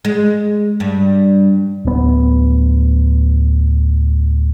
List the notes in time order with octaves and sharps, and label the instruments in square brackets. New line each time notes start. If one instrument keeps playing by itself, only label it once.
[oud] G#3
G2
[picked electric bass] D1 B3